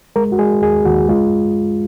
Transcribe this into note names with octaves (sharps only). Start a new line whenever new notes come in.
G#3 A#4
F#4
G#3 G#4
D#2 G#4
D#2 F#4
G#3 F4